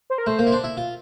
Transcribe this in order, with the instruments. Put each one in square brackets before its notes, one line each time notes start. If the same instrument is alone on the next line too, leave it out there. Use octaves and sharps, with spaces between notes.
[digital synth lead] C5
A#4
[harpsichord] A3 [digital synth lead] C5
[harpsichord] A#3
E4
D4
E4
F4